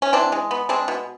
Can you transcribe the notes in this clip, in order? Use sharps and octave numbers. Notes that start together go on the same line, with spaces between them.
C#4
E3 C4 D4
G#3
B3
G#3 C4 D4
B2